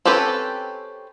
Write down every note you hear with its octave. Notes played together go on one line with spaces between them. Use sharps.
C4 C#4 G4 A4 B4